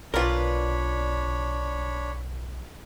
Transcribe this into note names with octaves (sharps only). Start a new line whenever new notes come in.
B1 D4 F4 A#4 B4 C#5 D5 B5